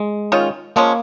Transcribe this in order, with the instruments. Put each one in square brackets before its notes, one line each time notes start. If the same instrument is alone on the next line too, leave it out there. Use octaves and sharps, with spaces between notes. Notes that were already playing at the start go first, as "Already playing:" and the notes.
Already playing: [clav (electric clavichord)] G#3
[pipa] D#3 C#4 F4
[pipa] F3 G#3 C#4 [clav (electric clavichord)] A#3